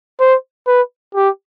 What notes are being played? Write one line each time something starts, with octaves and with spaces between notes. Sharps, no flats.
C5
B4
G4